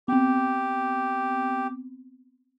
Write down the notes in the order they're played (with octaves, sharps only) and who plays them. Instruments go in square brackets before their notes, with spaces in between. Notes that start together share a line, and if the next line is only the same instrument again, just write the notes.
[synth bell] B3 C4 [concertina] G4